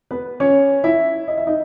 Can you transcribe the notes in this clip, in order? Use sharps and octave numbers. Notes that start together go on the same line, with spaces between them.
B3 B4
C#4 C#5
E4 E5
D#5
E5
D#4 D#5